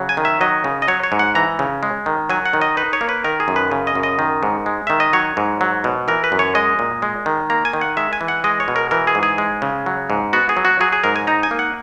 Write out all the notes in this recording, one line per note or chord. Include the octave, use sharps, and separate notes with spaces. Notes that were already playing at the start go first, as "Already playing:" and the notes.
Already playing: C#3 F#3
G#5
D#3
E5
F#3 D#5
C#3
D#5
F#3 C#5
C#5
G#2
F#5
E3 A#5
C#3
G#3
D#3
F#3 G#5
F#5
D#3
D#5
D#4 B4
C#5
A#3
B4
D#3 A#4
G#4
F#2
B4
C#3
D#5
F#2
D#5
D#3
G#2
G#3
D#3 E5
D#5
F#3 C#5
G#2
F#3
B2
E3 A#4
B4
F#2
C#5
G#3 D#5
A#2
G#3
D#3
A#3 A#5
G#5
D#3
F#5
G#3 E5
G#5
E3
F#5
G#3 D#5
C#5
B2
A#4
E3 A#4
G#4
G#2
G#4
G#3
C#3
F#3
G#2
B3 F#4
G#4
F#3
F#4
F#3 G#4
G#4
G#2 A#4
G#5
D#4 A#5
G#5
A#3
F#5